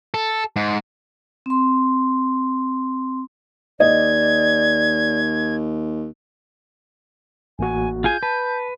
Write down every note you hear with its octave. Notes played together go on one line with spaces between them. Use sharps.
A4
G#2
C4 C6
D#2 D5 D#5 G#6
A1 A#3 F#4 G#5
F4 G#4 G#5 G6
B4 A5